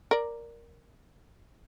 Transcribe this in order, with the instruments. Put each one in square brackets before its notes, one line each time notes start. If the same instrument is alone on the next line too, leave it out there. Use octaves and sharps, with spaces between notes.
[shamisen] A#4 D5